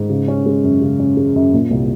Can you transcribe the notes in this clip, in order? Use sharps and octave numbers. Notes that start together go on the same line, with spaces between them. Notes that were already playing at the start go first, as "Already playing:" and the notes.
Already playing: G#2
C#3
C#4
G#3
F#2
C#3
C#4
G#3
F#2
A#2
C2